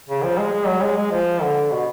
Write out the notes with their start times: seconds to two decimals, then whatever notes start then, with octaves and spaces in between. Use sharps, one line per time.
0.09 C#3
0.23 F3
0.38 G#3
0.52 G#3
0.67 F#3
0.82 G#3
0.97 G#3
1.11 F3
1.41 D3
1.71 B2